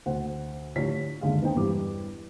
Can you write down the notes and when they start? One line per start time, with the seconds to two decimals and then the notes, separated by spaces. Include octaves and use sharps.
0.06 D2 C5 F#5
0.76 A2 D3 F3 G4 C#5 B6
1.21 G1 D#2 D3 G#3 F5
1.42 B3 D4 D#4 C5 G5
1.56 E2 G2 E3 D4 G4 D6